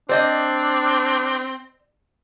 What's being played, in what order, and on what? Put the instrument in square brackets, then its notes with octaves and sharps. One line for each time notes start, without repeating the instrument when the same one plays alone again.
[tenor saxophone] C4 [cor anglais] D4 [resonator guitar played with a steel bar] C5 D5 D#5